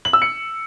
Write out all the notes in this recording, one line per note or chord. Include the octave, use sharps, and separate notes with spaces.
F#7
E6
C#7